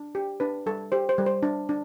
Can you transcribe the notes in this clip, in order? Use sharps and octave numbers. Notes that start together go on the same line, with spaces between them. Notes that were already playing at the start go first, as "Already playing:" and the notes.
Already playing: D4
G4
D4 B4
G3 A4
G4 C5
C5
G3
C5
D4
D4